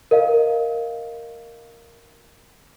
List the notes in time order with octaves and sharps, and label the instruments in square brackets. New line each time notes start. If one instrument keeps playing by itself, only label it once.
[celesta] A#4 D#5 F5